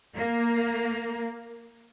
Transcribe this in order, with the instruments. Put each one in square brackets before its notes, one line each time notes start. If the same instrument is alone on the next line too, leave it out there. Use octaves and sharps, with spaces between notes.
[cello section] A#3